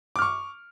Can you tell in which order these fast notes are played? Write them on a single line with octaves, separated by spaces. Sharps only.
D6 F6 C#6